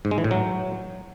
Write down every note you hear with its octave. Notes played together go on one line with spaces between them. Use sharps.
G#2
G#3
E3
A2
F#3